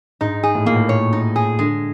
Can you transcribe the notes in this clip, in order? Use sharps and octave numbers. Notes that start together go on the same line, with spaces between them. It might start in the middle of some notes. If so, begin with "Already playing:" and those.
G#2 D#4
G#4
A2
A#2 A#3
A2
C#5
D#4
G#4
D3 G#3